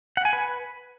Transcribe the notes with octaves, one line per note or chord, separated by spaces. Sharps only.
F#5
G#5
B4